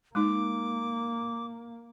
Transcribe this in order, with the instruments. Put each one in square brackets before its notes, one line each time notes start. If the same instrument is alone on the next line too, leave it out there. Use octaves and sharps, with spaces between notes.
[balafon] G#3 D#4 [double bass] A#3 [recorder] D6